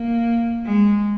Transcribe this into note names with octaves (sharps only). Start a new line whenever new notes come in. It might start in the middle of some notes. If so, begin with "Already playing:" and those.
Already playing: A#3
G#3